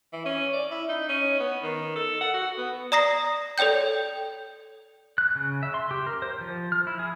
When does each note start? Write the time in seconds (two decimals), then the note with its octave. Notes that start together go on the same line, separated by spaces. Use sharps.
0.13 E3
0.26 C#4
0.53 D5
0.71 E4
0.89 D#4
1.09 C#4
1.40 B3
1.62 D#3
1.96 A4
2.21 F#5
2.34 F#4
2.58 B3
2.92 D5 A#5 D#6 A#6 C7
3.58 A4 C#5 D5 G5 G6
5.18 F#6
5.36 C#3
5.63 E5
5.74 C6
5.91 G4
6.07 A#4
6.22 C5
6.41 F3
6.72 F6
6.87 E4
6.99 G#4